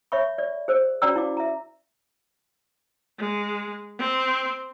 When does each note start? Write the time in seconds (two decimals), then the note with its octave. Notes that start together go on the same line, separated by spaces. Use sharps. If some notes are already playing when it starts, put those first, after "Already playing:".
0.12 C#5 E5 B5 C#6
0.38 D5
0.68 G#4 C5 E6
1.02 C#4 F#4 D5 G5 A#5 E6
1.16 E4 F5 D6
1.37 E5 A#5
3.19 G#3
3.99 C4